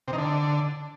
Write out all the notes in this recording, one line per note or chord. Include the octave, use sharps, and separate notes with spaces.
C3
D#3
D3